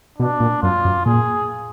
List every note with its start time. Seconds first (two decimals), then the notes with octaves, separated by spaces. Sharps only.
0.18 B2 D4
0.40 A#2
0.62 F#2 F4
0.85 F#2
1.06 A#2 G#4